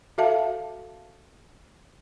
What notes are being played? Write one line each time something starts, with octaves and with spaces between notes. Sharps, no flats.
F#4 A4 E5 F5 A5